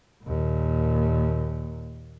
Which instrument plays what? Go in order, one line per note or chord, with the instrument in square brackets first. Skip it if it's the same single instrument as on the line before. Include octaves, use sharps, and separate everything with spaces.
[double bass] D#2 A#2